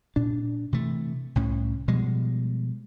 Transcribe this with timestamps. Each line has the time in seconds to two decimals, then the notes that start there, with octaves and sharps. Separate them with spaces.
0.16 A#2 D4
0.72 C3 E3 A3
1.35 C2 A2 C#4
1.88 B2 F3 G3 G#3